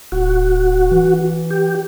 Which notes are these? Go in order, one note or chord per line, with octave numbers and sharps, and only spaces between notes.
D1 F#4
E3
G4